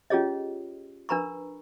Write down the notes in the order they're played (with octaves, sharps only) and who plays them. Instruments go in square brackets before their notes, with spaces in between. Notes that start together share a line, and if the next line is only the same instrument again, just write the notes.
[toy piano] C#4 F4 G4 G#4 C#5 D#5
D4 A#4 B4 A#5 B5 C#6